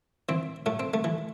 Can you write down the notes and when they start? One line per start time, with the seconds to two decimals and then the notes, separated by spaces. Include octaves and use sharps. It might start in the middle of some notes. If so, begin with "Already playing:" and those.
0.29 E3 C4
0.66 A2 A3
0.80 C4
0.94 A3
1.04 E3